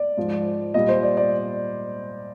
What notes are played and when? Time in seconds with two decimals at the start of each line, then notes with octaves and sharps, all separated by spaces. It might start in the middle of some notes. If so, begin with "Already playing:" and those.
Already playing: D5
0.17 G#2 F3
0.74 A#2 G3 D#5
0.89 C5
1.03 D5
1.17 D5